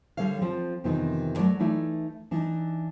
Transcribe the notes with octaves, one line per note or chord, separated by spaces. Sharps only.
D3 G3 A4 C#5 F5
F3 C4 A4
F2 C3 D#3 E3 B3 D#4
F#3 A3 C#5 D5
E3 A3 D#4 E4 D5
E3 D4 D#4